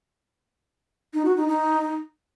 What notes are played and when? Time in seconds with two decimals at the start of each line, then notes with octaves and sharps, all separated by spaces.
1.13 D#4
1.25 F#4
1.37 D#4
1.48 D#4